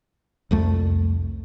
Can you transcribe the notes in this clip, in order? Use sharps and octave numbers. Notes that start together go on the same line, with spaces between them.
C2 F2 A3